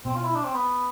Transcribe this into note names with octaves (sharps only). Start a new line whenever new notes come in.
B2 C4
F4
E4
D4
C4
B3